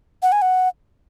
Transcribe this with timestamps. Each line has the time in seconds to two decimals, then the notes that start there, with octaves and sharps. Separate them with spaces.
0.22 F#5
0.32 G#5
0.42 F#5